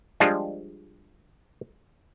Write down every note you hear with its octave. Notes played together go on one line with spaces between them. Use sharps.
F3 G3 G#3 D4 F4